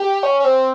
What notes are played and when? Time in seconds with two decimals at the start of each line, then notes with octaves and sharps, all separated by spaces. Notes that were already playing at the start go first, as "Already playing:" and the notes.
Already playing: G4
0.23 C#4
0.40 C#4
0.45 C4